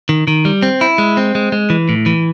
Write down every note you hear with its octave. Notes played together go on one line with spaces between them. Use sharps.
D#3
D#3
G3
C4
E4
G#3
C4
G#3
G#3
E3
A2
E3